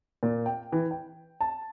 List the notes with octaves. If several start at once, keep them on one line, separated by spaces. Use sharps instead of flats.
A#2
G5
E3
G5
A5